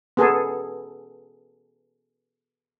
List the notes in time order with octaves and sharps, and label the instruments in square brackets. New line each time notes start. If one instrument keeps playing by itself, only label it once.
[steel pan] B3 G#4 A4